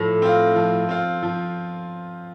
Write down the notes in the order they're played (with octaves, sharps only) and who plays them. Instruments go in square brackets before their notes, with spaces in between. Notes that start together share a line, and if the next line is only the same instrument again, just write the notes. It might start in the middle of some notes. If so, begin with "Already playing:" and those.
Already playing: [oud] A2 [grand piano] F3
[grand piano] C4 F4
F3
C4 F4
F3